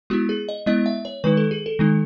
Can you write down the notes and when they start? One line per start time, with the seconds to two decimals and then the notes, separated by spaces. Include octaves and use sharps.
0.10 G#3 B3 E4 F#4
0.29 G#4
0.49 D#5
0.66 G#3 B3 E4 D#5
0.86 E5
1.05 C#5
1.24 D#3 G#3 D#4 B4
1.37 A4
1.51 G#4
1.66 A4
1.79 D#3 G#3 D#4